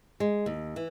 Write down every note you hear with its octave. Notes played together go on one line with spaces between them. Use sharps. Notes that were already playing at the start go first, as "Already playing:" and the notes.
G#3
D#2
E3